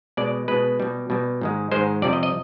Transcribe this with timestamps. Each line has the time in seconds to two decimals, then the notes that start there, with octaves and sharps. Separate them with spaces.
0.17 B2 G#3 D5
0.48 B2 G#3 B4
0.80 B2 G3
1.10 B2 G3
1.41 G#2 D#3 G#3
1.72 G#2 D#3 G#3 C5
2.02 F2 C3 G3 D5
2.13 D#5
2.23 D#5